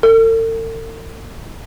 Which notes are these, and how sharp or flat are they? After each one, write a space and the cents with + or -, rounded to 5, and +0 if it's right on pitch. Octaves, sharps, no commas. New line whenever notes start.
A4 +45